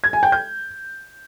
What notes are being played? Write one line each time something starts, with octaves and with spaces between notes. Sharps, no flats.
G#6
G#5
G5
G6